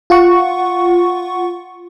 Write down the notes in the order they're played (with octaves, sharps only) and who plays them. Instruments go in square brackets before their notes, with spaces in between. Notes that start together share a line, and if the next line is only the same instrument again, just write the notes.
[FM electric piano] F4 F#5 C#6